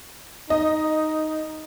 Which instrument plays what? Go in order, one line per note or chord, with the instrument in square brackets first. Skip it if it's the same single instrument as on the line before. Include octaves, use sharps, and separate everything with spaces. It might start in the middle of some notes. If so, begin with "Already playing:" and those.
[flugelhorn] D#4 [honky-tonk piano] D#5